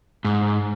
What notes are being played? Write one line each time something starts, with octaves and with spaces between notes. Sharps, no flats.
G#2